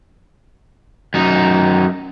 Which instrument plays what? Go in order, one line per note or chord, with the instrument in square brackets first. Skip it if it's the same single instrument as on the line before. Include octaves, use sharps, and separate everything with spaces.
[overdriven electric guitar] F#2 D#4